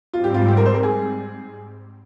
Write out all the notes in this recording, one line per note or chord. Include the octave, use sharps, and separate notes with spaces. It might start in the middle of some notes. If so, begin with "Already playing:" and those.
G#2 G3 C4 F4
G4
F4
G4
A#4
C5
A#4
G#4